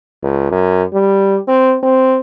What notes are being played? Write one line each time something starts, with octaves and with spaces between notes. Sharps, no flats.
C#2
F#2
G3
C4
C4